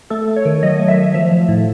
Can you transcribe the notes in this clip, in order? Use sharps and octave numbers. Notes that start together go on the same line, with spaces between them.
A3 A4
A3
C#5
D#3
F#3 D#5
A3
E5
A3
F3 E5
F3
A2